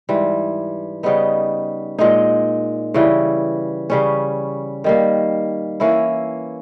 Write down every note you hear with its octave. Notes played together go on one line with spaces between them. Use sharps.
G#2 E3 G3
C#3 G3 B3 D#4
A#2 G#3 D#4
C#3 E3 G3
C#3 G3 C#4
D#3 G3 A#3
E3 A#3 C#4 E4